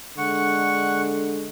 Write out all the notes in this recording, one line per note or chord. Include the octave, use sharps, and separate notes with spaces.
D3 G#3 F#5 C#6